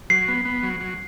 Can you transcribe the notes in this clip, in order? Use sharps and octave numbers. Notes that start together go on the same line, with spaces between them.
F#3 C7
B3
B3
F#3
F#3